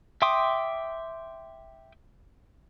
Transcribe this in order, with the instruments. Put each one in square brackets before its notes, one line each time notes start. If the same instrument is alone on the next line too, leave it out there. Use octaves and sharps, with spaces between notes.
[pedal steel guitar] E5 G5 C6 D6 D#6